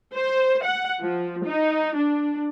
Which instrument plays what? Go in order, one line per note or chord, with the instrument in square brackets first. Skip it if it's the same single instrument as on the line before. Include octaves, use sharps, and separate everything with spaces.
[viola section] C5
F#5
F3
D#4
D4